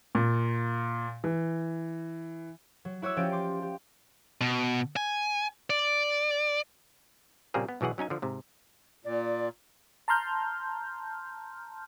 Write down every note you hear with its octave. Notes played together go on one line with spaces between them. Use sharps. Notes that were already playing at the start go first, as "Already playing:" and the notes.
A#2
E3
F#3
E4 F#4 C#5 D6 E6
F3 C#4 G4 D5 D7
C6 D6
G4
B2
G#5
D5
A#2 C#3 G3 A#3 C4 G#4
B3
B1 B2 E3 G#4 F#5
F#3 C#4 D#4 G#5
D3 F3
G#2 C3
A#2 D5
A5 A#5 C6 F6 G6